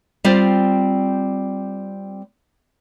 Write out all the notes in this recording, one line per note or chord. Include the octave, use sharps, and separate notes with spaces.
G3 C4 F4 C5 D5